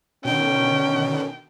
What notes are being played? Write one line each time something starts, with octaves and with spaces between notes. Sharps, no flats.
B2 D3 D#3 C#4 G5